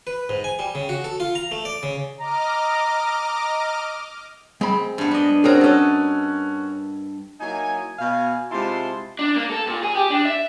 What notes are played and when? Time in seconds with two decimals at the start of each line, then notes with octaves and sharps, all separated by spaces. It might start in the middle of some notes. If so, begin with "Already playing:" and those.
0.07 B4
0.29 G#2
0.44 G#5
0.59 G3
0.75 C#3
0.89 F#4
1.04 A4
1.20 F4
1.35 A#5
1.52 A3
1.65 D5
1.83 C#3
2.20 D#5 A#5 D6 F6
4.61 G#3 C4 B5
4.98 G2 B3
5.11 D4 D#5
5.44 C4 C#4 F#4 G#4 A#4
5.61 C#4 F#4 A4 D#5
7.40 F#3 A#3 D#4 E4 G#5
7.98 B2 F5 G#5
8.52 C3 G#3 E4 F4 A5 C6
9.19 D4
9.36 A#3
9.50 A4
9.67 A#2
9.83 G#4
9.95 G4
10.10 D4
10.25 E5